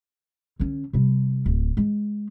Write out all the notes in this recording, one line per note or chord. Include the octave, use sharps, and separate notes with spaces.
D3 C#4
C3 G3
D1
G#3